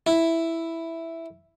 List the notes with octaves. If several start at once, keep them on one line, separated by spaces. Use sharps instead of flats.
E4